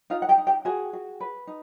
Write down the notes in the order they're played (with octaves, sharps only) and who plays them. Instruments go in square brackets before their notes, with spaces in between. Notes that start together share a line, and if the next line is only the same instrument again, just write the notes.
[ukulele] D#4 F4 F5
F#5
G4 G5
D#4
G4 G5
F#4 G#4 G#5
F#4
B4
D#4